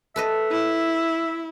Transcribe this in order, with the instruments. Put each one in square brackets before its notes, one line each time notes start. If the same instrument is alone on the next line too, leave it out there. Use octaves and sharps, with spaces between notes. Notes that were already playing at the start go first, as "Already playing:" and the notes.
[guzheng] A4 B4 D#5 [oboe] E5
[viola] E4